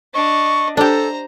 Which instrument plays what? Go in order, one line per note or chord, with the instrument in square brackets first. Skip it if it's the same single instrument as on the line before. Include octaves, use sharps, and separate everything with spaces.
[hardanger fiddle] D4 D#5 [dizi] C#6
[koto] D4 G4 [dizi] A4 [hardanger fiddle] C5 A#5